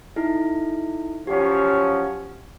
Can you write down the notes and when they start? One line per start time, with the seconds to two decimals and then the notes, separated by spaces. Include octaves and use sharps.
0.16 D#4 E4 A4
1.27 F3 F#3 C#4 G4